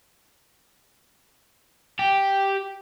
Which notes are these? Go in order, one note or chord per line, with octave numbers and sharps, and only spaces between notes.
G4